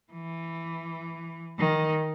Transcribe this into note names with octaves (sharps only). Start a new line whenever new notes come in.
E3
D#3